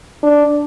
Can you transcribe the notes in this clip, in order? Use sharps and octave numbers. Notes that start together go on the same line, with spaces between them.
D4